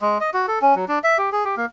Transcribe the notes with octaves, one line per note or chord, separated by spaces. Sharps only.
G#3
D#5
F#4
A4
C#4
F#3
D4
E5
G4
G#4
G4
A#3